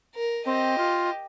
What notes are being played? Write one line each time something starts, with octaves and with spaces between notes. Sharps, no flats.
A#4
C4 G4 D#5
F4